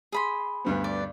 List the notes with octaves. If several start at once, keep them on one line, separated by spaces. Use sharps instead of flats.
G#4 B5 C6
D2 G2 B3
D5